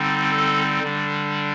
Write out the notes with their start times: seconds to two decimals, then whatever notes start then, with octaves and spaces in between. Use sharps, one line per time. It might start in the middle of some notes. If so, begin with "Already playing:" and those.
Already playing: D3 G3 C4 D#4
0.31 A4
0.83 D3 G3 D4